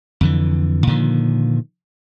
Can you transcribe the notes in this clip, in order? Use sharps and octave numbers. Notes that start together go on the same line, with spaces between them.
F2 D3 E3
A#2 D3 D#3 F3